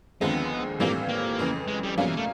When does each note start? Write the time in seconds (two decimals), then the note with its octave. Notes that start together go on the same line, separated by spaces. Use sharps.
0.21 D#2 D3 F3 G#3 B3 C4
0.80 A2 E3 G3 A#3 C4 F4
1.09 A#3
1.39 F2 C#3 E3
1.68 G#3
1.83 G3
1.98 B2 F#3 G3 A#3 C#4 F4
2.07 E3
2.17 A3